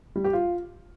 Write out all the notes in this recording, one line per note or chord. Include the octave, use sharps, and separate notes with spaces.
G3
G4
F4